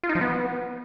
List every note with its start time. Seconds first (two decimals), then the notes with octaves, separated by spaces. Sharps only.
0.03 F4
0.09 D#4
0.15 F3
0.21 B3